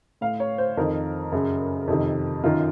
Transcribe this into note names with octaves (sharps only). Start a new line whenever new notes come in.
A2 F5
C#5
C5
F2 D#3 A#4
F#2 C#3
F2 C3 D#3
F#2 D#3 F4